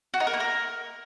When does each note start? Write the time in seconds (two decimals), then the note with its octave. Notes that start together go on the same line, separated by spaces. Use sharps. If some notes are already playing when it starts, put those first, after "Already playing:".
0.14 F#4
0.20 D#4
0.27 A#4
0.34 A#3
0.40 A#4